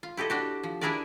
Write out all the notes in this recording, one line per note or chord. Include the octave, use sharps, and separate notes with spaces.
F4
E4 G4 A4 D#5
D4 F#4 G4
F3
D4 E4 G#4 A#4 B4 D5